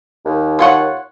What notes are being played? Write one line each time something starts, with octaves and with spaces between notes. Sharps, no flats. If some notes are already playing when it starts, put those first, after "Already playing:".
D#2
F4 C#5 F#5